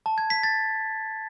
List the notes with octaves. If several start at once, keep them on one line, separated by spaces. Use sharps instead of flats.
A5
G#6
B6
A6